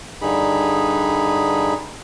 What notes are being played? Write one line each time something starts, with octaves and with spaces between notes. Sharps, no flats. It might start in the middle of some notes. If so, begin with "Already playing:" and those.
G2 D3 D#4 G#4 B5